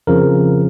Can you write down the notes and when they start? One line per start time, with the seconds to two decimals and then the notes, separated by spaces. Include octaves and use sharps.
0.07 F2 C#3 F3 A#4